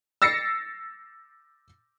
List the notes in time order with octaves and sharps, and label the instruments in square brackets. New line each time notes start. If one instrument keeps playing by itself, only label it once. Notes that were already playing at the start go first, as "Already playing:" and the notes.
[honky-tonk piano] E6 A6 A#6 C7 C#7